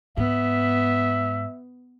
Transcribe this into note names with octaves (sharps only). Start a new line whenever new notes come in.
G#2 B3 E5